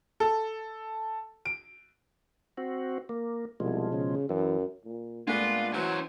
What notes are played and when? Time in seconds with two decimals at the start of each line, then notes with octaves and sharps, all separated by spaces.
0.20 A4
1.45 D7
2.58 C4 F#4
3.09 A#3
3.60 C2 B2 F3 G#3
3.93 C#3
4.29 F#2 E3
4.85 A#2
5.27 A#2 G#3 A3 B3 D4 F4
5.73 E3 F#3 C#4 C5